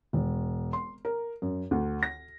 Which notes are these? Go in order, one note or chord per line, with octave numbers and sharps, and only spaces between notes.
E1
C6
A#4
F#2
D2
A#6